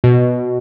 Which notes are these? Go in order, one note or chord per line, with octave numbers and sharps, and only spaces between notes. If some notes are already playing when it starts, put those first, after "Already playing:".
B2